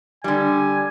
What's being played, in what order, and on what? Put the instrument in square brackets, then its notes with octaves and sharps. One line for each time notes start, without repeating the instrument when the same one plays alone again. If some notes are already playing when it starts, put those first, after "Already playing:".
[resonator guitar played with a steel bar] D3 G3 [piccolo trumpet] G#5